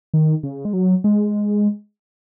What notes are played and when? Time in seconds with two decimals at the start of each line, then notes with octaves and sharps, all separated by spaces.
0.14 D#3
0.43 C#3
0.65 G#3
0.73 F#3
1.04 G#3